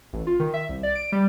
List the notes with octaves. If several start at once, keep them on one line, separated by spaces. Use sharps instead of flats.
A1
F4
D#3
E5
C2
D5
D7
G3